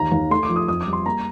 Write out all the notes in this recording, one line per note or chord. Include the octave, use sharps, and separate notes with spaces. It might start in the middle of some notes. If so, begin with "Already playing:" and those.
Already playing: D#2 A#5
D#2
A3 C6
D6
F3
D#6
F2 D#6
D6
G3
C6
A#3 A#5